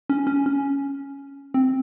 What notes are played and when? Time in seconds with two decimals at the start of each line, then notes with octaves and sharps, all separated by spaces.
0.10 C#4
0.27 C#4
0.46 C#4
1.54 C4